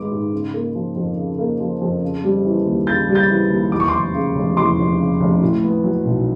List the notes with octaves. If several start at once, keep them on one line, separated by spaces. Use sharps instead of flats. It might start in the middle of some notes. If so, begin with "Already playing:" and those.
Already playing: G#2 D#3 G#3 B3 D6
G#2
C#3
A#3
F3
F2
C#3
A#3
F3
F2
C#3
G3
E3
D#2
C#3 G6 A6
G3
G6 A6
E3
D#2
E2 D6
C#6
F1 C6 D6
C#3
F1
E2 C6 D6
F1
C#3
F1
A2
B3
F#3
B1